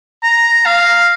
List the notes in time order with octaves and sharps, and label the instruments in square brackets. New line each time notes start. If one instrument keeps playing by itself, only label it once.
[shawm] A#5
F5